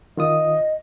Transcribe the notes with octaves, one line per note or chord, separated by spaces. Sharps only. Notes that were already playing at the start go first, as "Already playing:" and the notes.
D#3 F4 D#5 D#6